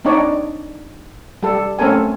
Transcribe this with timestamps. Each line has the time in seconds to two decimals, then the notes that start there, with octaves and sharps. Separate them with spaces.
0.05 C4 D4 D#4 C#5 D5
1.43 G3 A4
1.79 A3 C4 C#4 A4 A#4 G#5